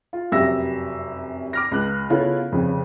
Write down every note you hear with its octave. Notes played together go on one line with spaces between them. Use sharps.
F4
F1 F#2 G4 E5 E6 A#6
D6 F6 A#6
C#2 F#6
C#3 B3 E4 F4 A4 C#5
F1 F2 C#3